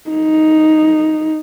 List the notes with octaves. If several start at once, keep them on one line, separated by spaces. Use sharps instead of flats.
D#4